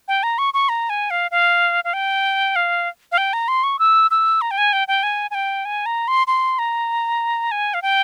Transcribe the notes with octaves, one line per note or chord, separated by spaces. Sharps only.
G5
A#5
C#6
C#6
A#5
G#5
F5
F5
F5
G5
F5
F5
G5
A#5
C6
C#6
E6
E6
A#5
G5
G#5
G5
G5
G#5
G#5
G5
G#5
A#5
C6
C6
A#5
G#5
F5
G5